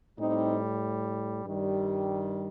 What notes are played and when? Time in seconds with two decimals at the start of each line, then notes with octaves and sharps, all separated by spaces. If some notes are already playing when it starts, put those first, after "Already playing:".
0.18 A2 G3 C4 D#4
1.46 G2 D#3 G3